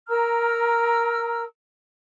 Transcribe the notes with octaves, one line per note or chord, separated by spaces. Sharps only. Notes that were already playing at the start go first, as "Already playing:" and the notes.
A#4 A#5 E6 F6